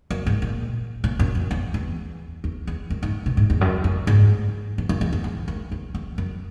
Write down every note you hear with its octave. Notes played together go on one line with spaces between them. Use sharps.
F#2
G#2
A#2
A#2
F#2
F#2
E2
E2
E2
E2
F#2
G#2
B2
G#2
E2
F#2
F#2
G#2
E2
F#2
E2
E2
G#2
F#2
E2
E2
F#2